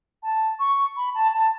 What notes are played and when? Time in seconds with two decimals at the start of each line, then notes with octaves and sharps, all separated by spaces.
0.23 A5
0.59 C#6
0.97 B5
1.15 A5
1.34 A5